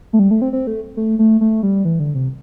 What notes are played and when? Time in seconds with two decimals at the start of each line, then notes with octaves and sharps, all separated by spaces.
0.13 A3
0.19 G3
0.31 A3
0.42 C4
0.53 C4
0.67 A3
0.97 A3
1.19 A3
1.41 A3
1.63 G3
1.85 E3
2.00 D3
2.15 C3